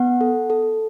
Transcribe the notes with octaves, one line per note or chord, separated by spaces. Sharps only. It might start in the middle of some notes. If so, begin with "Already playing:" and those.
Already playing: B3 F#5
A4
A4